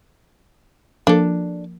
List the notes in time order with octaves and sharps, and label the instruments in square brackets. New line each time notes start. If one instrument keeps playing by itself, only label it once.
[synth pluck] F3 A#3 [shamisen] D4 A4